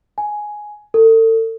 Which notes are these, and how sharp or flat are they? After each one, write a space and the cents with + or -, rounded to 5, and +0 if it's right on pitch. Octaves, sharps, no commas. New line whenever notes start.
G#5 +10
A4 +35